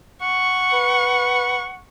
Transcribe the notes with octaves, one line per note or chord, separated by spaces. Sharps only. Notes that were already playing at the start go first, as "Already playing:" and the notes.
F#5 C#6
B4